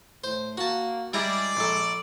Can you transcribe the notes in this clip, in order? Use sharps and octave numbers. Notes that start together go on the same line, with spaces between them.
A2 C5
A#3 F#4 A5
G3 G#3 E4 D5 A#5
A#1 A4